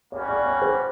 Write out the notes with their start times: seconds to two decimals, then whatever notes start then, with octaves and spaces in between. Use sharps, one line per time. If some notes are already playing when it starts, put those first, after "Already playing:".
0.12 G3 A#3 C#4 F#4 C#5
0.29 D5
0.46 C#5
0.62 C5